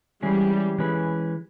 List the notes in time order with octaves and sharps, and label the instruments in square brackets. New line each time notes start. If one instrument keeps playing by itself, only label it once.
[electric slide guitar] E3 G#3 C#4 G#4 [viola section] G3
[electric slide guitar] E3 G#3 C#4 G#4 B4